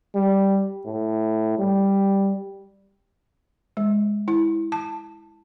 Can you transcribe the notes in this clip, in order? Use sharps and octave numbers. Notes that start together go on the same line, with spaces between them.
G3
A2
G3
G#3
E4
A5